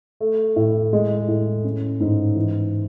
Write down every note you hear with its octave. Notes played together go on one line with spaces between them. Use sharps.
A3
A2
G#3
A2
C#4
G#2
E3